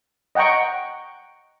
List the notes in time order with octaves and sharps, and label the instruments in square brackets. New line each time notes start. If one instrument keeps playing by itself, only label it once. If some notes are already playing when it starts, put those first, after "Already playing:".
[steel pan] D#5 F#5 G5 A#5 C#6